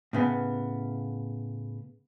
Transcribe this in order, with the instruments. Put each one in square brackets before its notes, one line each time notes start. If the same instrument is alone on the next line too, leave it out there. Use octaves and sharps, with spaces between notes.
[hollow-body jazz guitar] A2 C#3 B3